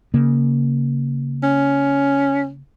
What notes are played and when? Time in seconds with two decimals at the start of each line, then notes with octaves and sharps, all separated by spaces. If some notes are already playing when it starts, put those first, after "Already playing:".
0.14 C#3 A#3
1.44 C#4